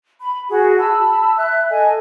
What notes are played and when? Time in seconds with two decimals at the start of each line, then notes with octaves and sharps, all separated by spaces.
0.20 B5
0.49 F#4 G#4
0.78 A5 B5 E6
1.36 E5 F#6
1.71 A4 D#5 G#5